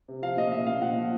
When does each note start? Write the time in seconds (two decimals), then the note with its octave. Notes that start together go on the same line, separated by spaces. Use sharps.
0.08 C3
0.22 F3 F5
0.37 A#2 D#5
0.52 A#2 E5
0.67 A#2 F5
0.81 A#2 F#5
0.97 F3